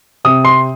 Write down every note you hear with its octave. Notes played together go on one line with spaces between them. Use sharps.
C3 D#6
C6